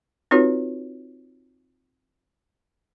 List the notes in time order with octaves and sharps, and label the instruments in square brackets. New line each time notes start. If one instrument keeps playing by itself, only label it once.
[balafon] C4 D#4 F4 F#4 B4 C#5